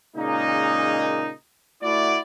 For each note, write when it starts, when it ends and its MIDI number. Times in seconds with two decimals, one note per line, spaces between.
0.16 1.30 46
0.16 1.30 49
0.16 1.30 56
0.16 1.30 58
0.16 1.30 63
1.82 2.18 57
1.82 2.18 64
1.82 2.18 66
1.82 2.18 74